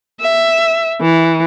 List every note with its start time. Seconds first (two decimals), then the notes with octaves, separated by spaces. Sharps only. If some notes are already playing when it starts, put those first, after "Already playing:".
0.20 E5
1.01 E3